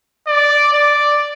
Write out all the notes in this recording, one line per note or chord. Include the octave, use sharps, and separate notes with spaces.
D5
D5